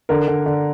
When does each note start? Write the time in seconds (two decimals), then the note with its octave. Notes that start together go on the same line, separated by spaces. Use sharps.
0.09 D3 A#4
0.28 D3
0.46 D3